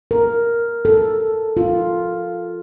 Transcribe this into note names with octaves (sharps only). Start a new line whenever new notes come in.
A#4
A4
F4